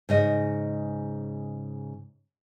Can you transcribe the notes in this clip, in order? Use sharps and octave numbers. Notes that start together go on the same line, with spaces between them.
G#2 C#3 D#5